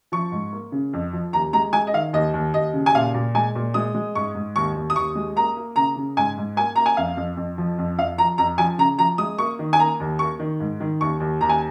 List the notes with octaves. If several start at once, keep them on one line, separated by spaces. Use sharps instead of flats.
F3 C#6
G#2
A#3
C#3
F2
F3
D#2 A#5
G#3 A#5
G#3 G#5
D#5
D#3 F5
D#2 D#5
D#2
D#2 D#5
C#3
G#5
A#2 F5
A#2
G#3 G#5
A#2
G#3 D#6
G#3
G#2 C#6
G#2
D#2 C#6
D#2
D#6
D#2 C#6
G#3
A#3 A#5
A#3
C#3 A#5
C#3
G#2 G#5
G#2
A#3 G#5
A#3 A#5
G#5
F2 F5
F2
F2
F3
F2
F2 F5
F3 A#5
F2 A#5
F3 G#5
C#3 A#5
F3 A#5
G#3 D#6
A#3 C#6
D#3
G#5
A#3 A#5
D#2
A#3 C#6
D#3
G#2
D#3
D#2 C#6
D#2
D#2 A#5
G#5